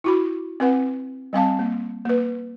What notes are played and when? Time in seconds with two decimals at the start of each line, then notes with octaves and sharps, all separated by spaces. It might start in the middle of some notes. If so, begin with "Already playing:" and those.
0.04 E4 F#4 B5
0.60 C4 B4 F#5
1.33 G3 C4 F5 A5
1.59 A#3
2.05 A#3 B4